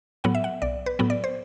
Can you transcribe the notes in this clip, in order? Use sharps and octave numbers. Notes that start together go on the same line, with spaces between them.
A2 F#3 B3 F#5
E5
F#5
B1 D5
B4
A2 F#3 B3
D5
C5